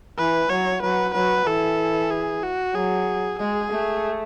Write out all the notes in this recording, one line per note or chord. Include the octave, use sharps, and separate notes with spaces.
E3 B4
F#3 C#5
F#3 B4
F#3 B4
E3 A4
G#4
F#4
F#3 G#4
G#3 G#4
A3